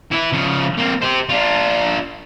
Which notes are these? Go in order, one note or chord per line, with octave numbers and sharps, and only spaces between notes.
E3 E4
C#3 F3
A#3 C4
G4 C5
D4 F4